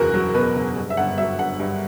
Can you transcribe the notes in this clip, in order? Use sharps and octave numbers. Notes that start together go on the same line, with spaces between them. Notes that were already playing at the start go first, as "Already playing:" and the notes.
Already playing: F#1 E2 B2 F#4 A#4
F#3
B2 B4
F#1
G2
E5
G1 F#5
F#3 E5
G1 F#5
G2